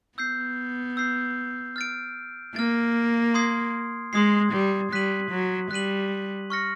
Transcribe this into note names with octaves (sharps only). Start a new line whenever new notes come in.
B3 E6 G6 C7
E6 G6 C7
F6 A6 D7
A#3 F6 A6 D7
C6 D#6 G#6 C7
G#3 C6 D#6 G#6 C7
G3
G3 F#6 B6 D#7 F#7
F#3
G3 F#6 B6 D#7 F#7
C#6 F6 A#6 C#7